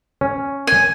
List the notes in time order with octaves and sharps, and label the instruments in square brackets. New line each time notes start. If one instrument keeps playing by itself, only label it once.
[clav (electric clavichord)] C#4
[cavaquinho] G#5